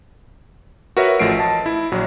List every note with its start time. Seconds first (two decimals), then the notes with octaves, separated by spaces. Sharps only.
0.97 F#4 A#4 B4 C#5 E5
1.19 A1 F3 A3 C7 D7
1.39 D#5 A5
1.66 E4
1.92 A#1 F#3